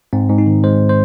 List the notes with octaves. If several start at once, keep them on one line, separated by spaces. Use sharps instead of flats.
G#2 C4
G#2
D#4
D#3
G#3 C5
C5